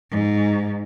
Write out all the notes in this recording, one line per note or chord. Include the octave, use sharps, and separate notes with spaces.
G#2